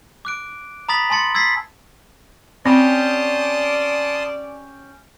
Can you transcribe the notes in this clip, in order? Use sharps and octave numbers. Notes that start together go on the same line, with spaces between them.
D6 F#6 D7
A#5 B5 D#6 A6 B6 F#7
G#5 A5 C6 A6 C#7
E6 G#6 A6 B6 C7
C4 C#4 G4 D5 A5 C6 D#6